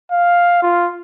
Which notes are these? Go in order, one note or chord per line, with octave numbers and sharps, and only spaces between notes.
F5
F4